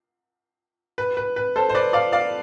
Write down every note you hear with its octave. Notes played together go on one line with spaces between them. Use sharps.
B4
B4
B4
A4 C5
C5
B4 D5
D5 F5
D5 F5